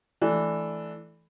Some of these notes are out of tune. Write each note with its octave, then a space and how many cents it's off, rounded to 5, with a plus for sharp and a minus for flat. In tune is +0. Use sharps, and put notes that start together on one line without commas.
E3 +0 A3 -15 D4 +0